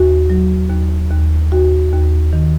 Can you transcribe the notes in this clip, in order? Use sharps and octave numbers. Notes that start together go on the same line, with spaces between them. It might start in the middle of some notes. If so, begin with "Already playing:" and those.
Already playing: D#2 F#4
F#3
D#2
D#2
D#2 F#4
D#2
D#3